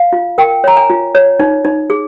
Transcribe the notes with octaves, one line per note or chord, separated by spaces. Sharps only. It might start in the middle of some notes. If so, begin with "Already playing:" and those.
Already playing: F5
F4
A#4 G5
C#5 A#5
G#5
F4
C#5
D#4
D#4
G#4